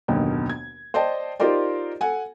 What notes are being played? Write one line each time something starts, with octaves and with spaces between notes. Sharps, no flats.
F#1 D#2 B2 D3
G#6
C5 D5 D#5 G5 A5
D#4 F4 G4 A#4 C5 D5
A4 F#5 G#5